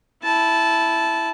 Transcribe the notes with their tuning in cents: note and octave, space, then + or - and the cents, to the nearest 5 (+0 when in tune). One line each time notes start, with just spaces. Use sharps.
E4 +0 A5 -15